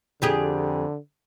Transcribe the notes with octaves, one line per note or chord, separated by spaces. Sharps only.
F2 D3 G4 G#4